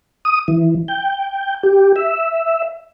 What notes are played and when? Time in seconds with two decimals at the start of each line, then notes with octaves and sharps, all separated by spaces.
0.25 D#6
0.48 E3
0.88 G5
1.63 G4
1.96 E5